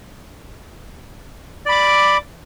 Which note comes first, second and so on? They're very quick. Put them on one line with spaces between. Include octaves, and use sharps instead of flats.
D5 B5 D6